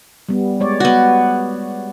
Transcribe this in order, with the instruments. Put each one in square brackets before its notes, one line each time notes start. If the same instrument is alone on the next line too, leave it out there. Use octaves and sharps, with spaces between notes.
[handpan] G3 B3
G#3 C#5 D5
[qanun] B3 F#4